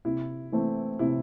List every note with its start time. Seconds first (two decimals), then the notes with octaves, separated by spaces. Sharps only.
0.05 C3 E4
0.52 E3 A3 C4
0.99 C3 E4